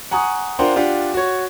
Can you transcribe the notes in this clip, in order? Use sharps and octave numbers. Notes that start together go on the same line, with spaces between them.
F#5 G#5 A#5 C#6 D#6
D4 F4 A#4 C5 F#5 G5
D4 F4 G4 D5 F#5
F#4 C#5